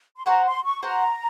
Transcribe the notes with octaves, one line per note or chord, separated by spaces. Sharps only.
C6
F#4 C5 F#5 A#5
C6
C#6
F#4 C5 F#5 A#5